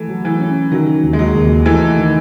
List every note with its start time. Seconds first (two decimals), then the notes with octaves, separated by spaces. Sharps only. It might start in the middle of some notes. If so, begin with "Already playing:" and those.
Already playing: E3 A3
0.08 F#3
0.25 E3
0.40 C#4
0.71 D#3 F#3
1.03 D#2
1.13 G#3
1.19 F#3
1.35 D#2
1.66 E3 A3
1.98 D#3